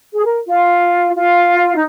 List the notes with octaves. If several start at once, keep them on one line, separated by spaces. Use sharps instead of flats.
G#4
A#4
F4
F4
D#4